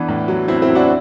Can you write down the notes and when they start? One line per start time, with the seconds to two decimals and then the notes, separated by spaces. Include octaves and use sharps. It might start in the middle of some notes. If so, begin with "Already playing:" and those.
Already playing: E3 B3 D4
0.09 A2
0.28 F#3
0.48 F#3 C4 E4
0.62 C4 E4
0.69 F#3
0.75 D4 F#4